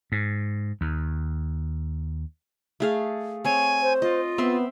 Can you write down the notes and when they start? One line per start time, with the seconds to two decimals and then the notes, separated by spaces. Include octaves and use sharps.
0.12 G#2
0.81 D#2
2.80 A3 G#4 F5
3.45 C4 C#5 G#5
3.82 C5
4.02 F4 D#5
4.38 B3 C4 E5 C6